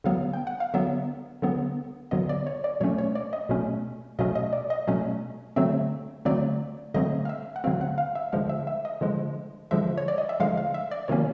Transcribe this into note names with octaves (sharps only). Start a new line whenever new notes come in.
D3 F#3 B3 F5
G5
F#5
F5
D3 F#3 B3 E5
D3 F#3 B3
D3 F#3 B3 D#5
D5
C#5
D5
B2 F#3 A3 C#4 C#5
C#5
D5
D#5
B2 F#3 A3 C#4
B2 F#3 A3 C#4 D#5
D#5
D5
D#5
B2 F#3 A3 C#4
D3 F#3 A3 C4 E5
D3 F#3 A3 C4 D5
D3 F#3 A3 C4 D#5
F5
E5
F#5
D3 F#3 A3 C4 F5
F#5
F5
E5
D3 F3 G#3 F5
E5
E5
D#5
D3 F3 G#3
D3 F3 G#3 E5
C#5
D5
D#5
E5
D3 F3 G#3 F5
F5
E5
D5
C3 D#3 F#3 A#3 C#4 C#5